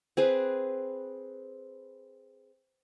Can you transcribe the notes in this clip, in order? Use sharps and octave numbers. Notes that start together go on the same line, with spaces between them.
C4 G#4 B4